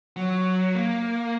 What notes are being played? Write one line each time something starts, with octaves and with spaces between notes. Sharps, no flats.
F#3
A#3